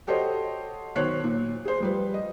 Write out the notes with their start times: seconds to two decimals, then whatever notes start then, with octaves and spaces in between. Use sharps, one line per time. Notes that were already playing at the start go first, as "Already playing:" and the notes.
0.07 F#4 G4 A4 C5 C#5 D#5
0.96 B1 D#3 C5 C#5 F#6 C7
1.24 A#2
1.65 G#4 C5
1.80 F3 G3 B4
2.14 D#5